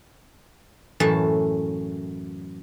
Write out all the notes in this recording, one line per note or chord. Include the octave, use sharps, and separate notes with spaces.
F#2 A2 E3 A4 E5 A5